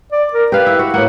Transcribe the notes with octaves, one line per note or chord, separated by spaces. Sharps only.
D5
A#4
G4 B4 F5
E4
F#4
A2 A#3 F#5